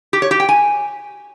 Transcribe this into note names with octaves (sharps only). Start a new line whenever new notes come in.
G4
C#5
G4
G5
G#5